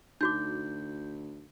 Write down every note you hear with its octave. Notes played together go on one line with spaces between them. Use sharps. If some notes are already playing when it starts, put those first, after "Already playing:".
D2 D#4 F#4 D6 G6